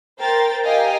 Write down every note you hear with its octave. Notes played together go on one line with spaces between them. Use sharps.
A#4 C5 G5 A6
G4 A#4 D#5 F5 G5 G#5